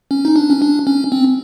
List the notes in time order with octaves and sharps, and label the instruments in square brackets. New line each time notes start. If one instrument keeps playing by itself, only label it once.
[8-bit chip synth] C#4
D#4
D4
C#4
D4
C#4
C4